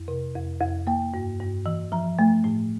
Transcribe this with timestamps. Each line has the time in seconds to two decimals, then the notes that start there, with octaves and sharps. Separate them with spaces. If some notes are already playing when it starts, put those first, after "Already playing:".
Already playing: F2
0.08 C3
0.35 F2
0.60 F2
0.87 A#3 G5
1.14 G2
1.40 G2
1.66 E3
1.92 F3 A#5
2.19 A3
2.44 A2